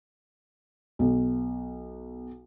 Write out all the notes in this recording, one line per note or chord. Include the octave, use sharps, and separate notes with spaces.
B1